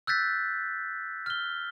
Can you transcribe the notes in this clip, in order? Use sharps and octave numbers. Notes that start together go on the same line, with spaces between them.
E6 F#6 G6 A6 B6
F6 G7